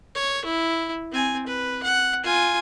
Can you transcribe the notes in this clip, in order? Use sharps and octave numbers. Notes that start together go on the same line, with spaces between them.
C#5
E4
C4 G#5
B4
F#5
F4 G#5